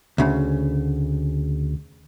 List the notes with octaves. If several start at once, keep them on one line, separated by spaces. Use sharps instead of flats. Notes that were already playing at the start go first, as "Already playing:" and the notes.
D2 C#3